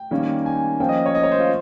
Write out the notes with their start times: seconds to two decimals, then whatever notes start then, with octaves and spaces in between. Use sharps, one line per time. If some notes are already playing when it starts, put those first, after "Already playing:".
Already playing: G5
0.11 D#3 G3 A#3 C#4
0.46 G#5
0.80 F3 A#3 C#4 G5
0.89 D#5
1.06 C#5
1.15 D#5
1.23 C#5
1.32 C5
1.40 F4